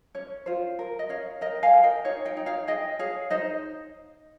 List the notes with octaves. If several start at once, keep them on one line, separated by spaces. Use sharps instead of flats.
C#4 C#5
F4 C5
A#4
D#5
C#4 C#5 F5
A#4 D#5 G5
F5 G#5
A#4
D#5 G5
D#4 C#5 F5
D#5 G5
D#4
C#5 F5
G#4 D#5 G5
G#4 C#5 F5
D#4 C5 D#5